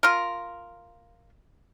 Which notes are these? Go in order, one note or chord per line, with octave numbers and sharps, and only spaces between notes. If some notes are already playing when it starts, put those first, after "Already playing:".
F4 A#4